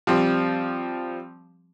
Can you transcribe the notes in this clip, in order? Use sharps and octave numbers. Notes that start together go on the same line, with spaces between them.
F3 G3 C4